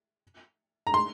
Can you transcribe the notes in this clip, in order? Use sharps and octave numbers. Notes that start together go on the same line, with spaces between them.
A#5
C6